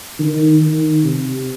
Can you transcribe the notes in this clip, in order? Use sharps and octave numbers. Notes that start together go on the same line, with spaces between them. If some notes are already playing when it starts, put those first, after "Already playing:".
D#3
D#3
C3